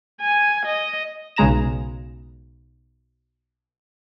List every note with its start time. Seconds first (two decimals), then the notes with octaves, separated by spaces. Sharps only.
0.21 G#5
0.66 D#5
1.36 B1 C#3 G#3 A#5 A#6 E7